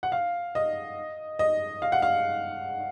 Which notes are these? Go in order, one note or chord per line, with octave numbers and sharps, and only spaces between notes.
F#5
F5
D#5
D#5
F5
F#5
F5